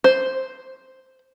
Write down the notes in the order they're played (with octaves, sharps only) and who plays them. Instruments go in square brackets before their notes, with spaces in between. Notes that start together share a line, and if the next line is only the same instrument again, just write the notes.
[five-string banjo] C5